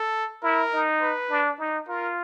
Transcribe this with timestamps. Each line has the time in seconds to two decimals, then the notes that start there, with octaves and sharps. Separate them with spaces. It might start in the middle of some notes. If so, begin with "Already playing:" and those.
Already playing: A4
0.43 E4 A#4
0.73 D#4
1.02 B4
1.31 D4
1.60 D#4
1.89 F4 A#4